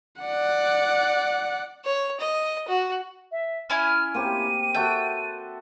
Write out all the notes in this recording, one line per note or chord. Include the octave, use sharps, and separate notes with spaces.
D5 F#5
C#5
D#5
F#4
E5
C#4 E4 G#5 F6
A#3 C4 G4 D#7
F#4 A4 E5 G5